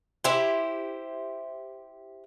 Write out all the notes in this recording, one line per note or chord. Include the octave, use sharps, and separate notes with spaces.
E4 G4 C5